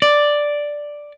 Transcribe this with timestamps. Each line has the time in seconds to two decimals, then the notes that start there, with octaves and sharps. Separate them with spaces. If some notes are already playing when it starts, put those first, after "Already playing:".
0.02 D5